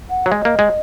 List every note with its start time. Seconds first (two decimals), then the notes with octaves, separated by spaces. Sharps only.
0.10 F#5
0.26 F#3
0.31 G#3 D#5
0.45 A#3
0.59 G#3